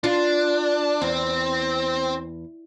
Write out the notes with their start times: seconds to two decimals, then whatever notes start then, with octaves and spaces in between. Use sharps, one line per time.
0.04 D4 F4
1.02 E2 C4